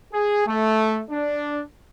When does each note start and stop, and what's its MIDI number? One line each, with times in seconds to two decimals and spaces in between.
0.13 0.43 68
0.47 1.01 57
1.10 1.61 62